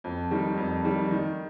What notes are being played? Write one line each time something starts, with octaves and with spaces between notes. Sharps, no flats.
F2
D#3 G3
F2
D#3 G3
D#3